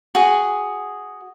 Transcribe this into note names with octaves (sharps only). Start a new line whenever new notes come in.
F#4 G#4